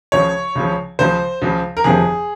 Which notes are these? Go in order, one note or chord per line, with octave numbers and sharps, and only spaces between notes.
C#2 C#3 F3 C#5
C#2 C#3 F3
C#2 C#3 F3 C5
C#2 C#3 F3
A#4
G1 F2 C3 F3 G#4